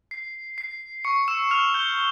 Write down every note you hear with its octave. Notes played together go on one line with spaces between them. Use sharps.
C7
C7
C#6 C#7
E6 E7
F6 F7
G6 G7